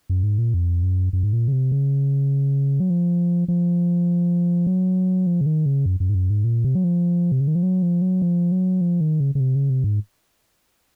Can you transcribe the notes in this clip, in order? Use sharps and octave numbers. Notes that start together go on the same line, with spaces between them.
F#2
G#2
A#2
F2
F#2
F#2
G#2
A#2
C#3
C3
C#3
F#3
F3
F3
F#3
F3
C#3
D#3
C#3
F#2
F#2
G#2
F#2
G#2
A#2
C3
F#3
F3
C3
C#3
D#3
F3
F#3
F3
F#3
F3
F#3
F3
D#3
C#3
C#3
C3
C#3
C3
G#2